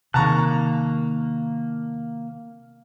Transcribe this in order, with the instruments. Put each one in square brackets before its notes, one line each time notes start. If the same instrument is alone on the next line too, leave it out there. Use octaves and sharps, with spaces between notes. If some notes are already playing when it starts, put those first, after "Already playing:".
[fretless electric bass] C3 D#3 [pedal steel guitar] A#3 F#6 [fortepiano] A5 A#5 C#6